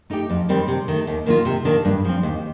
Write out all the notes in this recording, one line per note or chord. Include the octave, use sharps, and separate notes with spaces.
A3 D#4 G4
F2
D#3 G3 C4
C3
D#3 A3
D#2
D#3 A#3 F4
C3
D#3 A#3 D4
G2
F3 C4
D#2